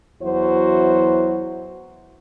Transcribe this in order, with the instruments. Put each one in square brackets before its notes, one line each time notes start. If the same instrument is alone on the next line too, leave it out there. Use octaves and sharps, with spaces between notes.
[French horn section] E2 F#3 E4 F#4 C5